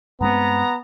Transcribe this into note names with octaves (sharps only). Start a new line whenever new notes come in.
G2 G#3 B3 C4 A#5